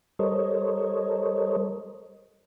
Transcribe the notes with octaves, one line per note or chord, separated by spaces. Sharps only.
G3 A4 A#4 C5 C#5 D#5